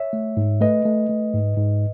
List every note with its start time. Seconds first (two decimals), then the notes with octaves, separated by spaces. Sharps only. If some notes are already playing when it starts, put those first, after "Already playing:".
Already playing: C#5 E5
0.13 A3
0.37 G#2
0.61 A3 B4 D#5
0.85 A3
1.09 A3
1.34 G#2
1.57 G#2